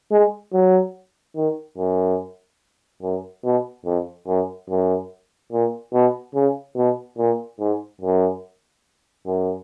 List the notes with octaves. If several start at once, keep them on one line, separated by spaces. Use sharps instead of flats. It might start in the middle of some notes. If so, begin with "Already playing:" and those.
G#3
F#3
D#3
F#2
F#2
B2
F2
F#2
F#2
A#2
B2
C#3
B2
A#2
G#2
F#2
F#2